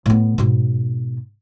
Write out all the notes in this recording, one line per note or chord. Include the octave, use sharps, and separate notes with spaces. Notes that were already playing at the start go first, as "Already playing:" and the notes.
A2 B3
G#2 B2